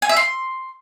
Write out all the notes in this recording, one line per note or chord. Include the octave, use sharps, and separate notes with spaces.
G#5
E5
C6